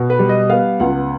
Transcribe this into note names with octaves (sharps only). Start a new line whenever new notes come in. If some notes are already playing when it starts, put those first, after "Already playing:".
Already playing: B2
B4
G3
D#5
B3 F5
C#2 F#5